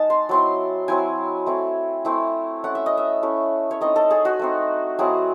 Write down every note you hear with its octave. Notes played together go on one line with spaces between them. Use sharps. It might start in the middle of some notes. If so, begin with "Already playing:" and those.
Already playing: G#3 D#4 A5
C6
F#3 C4 E4 C6
F#3 C4 E4 G#5
A3 C4 E4
A3 C4 E4
A3 C#4 E4 F#5
E5
D#5
E5
A3 C#4 E4
C#5
A3 C4 D#4 D#5
A4
G#4
F#4
A3 C4 D#4
F#3 A3 C4 E4 G#4